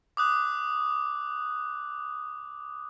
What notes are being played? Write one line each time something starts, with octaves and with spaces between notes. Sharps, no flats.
D6 D#6 F#6